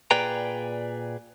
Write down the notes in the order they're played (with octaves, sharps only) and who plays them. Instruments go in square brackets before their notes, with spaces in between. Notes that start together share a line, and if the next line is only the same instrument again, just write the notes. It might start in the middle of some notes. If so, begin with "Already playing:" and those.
[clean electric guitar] A#2 G#4 B4 D5 G5 A#5